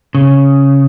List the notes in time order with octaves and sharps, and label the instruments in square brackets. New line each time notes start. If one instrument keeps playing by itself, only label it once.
[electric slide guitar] C#3